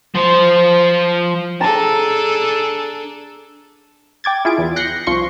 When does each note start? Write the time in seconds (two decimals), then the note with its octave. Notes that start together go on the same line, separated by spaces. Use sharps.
0.15 F3 C5
1.60 D4 G#4 A4 A5 A#5
4.24 G5 D6 G#6 A6
4.45 E4 F4 G#4 D7
4.58 E2
4.76 F#6 G6 A#6 C7 C#7
5.07 C2 F3 C6 C#6 C#7